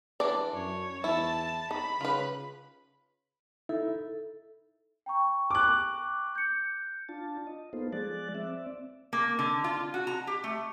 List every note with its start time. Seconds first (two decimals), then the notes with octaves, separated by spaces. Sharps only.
0.20 E3 D4 D5
0.54 F#2 C#5
1.04 E2 E4 A5
1.71 D#4 B5
2.01 C#3 F4 B4
3.69 D#4 E4 A4 E5
5.06 G5 A#5 C#6
5.51 D6 F#6
6.35 G6 C#7
7.09 D4 F4 A5
7.47 D#5
7.73 A#3 B3 D#4 F4 A4 C5
7.92 F3 G#3 G#4 D5 F#6 A6
8.35 C4 D5 E5
9.13 A#3
9.39 D3
9.64 F4
9.94 F#4
10.07 A#5
10.27 G4
10.44 A3